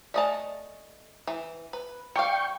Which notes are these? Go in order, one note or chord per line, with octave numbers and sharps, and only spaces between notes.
A3 D5 D#5 G#5 A5
E3
B4
G3 F5 G5 C#6